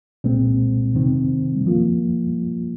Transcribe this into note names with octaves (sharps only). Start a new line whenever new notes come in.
C2 A#2 G#3 C4
F2 C3 D#3 C4
F2 F3 A#3 F4